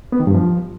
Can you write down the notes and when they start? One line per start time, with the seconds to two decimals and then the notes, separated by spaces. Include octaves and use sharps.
0.12 B3
0.20 D#3
0.27 G2
0.34 F3